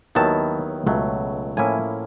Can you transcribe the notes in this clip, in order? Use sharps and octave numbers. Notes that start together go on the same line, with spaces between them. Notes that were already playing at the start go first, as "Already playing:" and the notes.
D#2 D#3 F#3 B3 E4 A5
C#2 B2 F#3 A3
A2 F3 A#3 C#4 E4 G#5